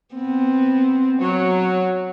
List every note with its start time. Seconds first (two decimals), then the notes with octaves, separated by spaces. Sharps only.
0.15 B3 C4
1.22 F#3 C#5